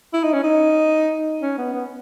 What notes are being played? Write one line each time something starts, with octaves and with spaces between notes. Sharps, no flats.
E4
D#4
C#4
D#4
C#4
B3
B3